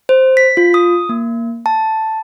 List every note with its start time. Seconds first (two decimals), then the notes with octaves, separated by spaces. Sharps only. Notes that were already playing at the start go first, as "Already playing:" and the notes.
0.09 C5
0.37 B6
0.57 F4
0.74 D#6
1.09 A#3
1.66 A5